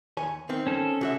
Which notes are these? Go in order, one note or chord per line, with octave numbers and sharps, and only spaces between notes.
D#2 C#5 G#5
D#3 C4
C#4 A4
C2 F#4 E5